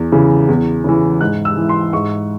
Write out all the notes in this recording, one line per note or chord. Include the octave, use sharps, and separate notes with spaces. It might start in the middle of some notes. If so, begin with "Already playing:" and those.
Already playing: E2
C#3 E3
E2
C#3 E3
G#2 F#6
E6
E3
C6
G#2 C#6